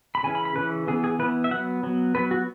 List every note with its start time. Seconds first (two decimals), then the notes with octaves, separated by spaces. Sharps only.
0.15 B5
0.23 C#3 E3 C#4 G#5
0.35 B5
0.45 B5
0.55 C#3 E3 C#4 B4
0.87 E3 B3 G#4
1.04 G#4
1.19 E3 B4
1.23 B3
1.44 E5
1.51 F#3 F#5
1.54 B3
1.83 F#3 B3
2.15 F#3 B3 B4
2.31 F#4